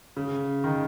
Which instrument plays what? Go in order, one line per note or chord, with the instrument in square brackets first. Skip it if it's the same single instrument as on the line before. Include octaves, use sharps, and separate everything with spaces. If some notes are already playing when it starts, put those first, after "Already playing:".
[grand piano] C#3
D#3